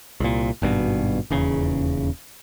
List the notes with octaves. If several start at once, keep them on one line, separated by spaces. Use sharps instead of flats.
C2 A#2
G#1 G2 B2
D#1 E2 C#3